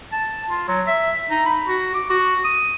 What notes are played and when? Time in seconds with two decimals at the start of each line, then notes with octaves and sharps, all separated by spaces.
0.12 A5
0.50 F4
0.68 F#3
0.87 E5
1.30 D#4
1.46 B5
1.67 F#4
1.94 D6
2.10 F#4
2.44 D#6